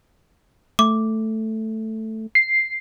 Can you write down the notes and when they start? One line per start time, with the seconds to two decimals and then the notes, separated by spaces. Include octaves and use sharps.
0.79 A3 D6
2.35 C7